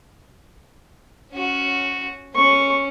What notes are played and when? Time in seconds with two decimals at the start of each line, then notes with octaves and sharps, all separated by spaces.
1.33 C#4 F#4
2.35 C#4 C#6